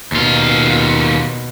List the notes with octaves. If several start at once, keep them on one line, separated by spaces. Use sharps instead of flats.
D#2 B2 F4